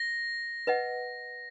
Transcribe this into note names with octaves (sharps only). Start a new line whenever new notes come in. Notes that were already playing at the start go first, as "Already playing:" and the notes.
Already playing: A#6
B4 D#5 F#5